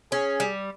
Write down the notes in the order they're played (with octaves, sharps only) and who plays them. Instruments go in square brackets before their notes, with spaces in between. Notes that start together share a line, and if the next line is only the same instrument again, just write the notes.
[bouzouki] C#4 [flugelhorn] G#4
[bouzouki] G3